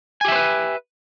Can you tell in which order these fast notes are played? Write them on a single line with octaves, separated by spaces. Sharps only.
G#5 G4 E5 C5 B4